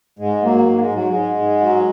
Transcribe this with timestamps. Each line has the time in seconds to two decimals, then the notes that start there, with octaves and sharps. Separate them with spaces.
0.19 G#2 G#3
0.43 F#3 A#3
0.66 G#2 A#3
0.80 G#3
0.90 G#2 F#3
1.08 G#3
1.13 G#2
1.37 G#2
1.60 F#3